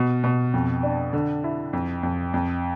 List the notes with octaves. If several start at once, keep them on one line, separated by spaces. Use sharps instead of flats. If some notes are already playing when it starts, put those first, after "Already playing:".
Already playing: B2
B2
F2
D4
D3
E4
F2
F2
F2